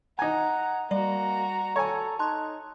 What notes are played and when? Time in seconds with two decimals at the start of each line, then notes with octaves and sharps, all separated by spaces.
0.19 D#4 F#5 G#5 A#5
0.91 G3 A#3 F#4 D5 A#5
1.76 A4 C#5 G#5
2.19 D#4 A5 C6 F#6